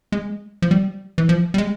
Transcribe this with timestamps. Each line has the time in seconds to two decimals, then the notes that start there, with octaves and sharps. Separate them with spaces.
0.12 G#3
0.62 F3
0.71 G3
1.18 E3
1.29 F3
1.54 G3
1.58 G#3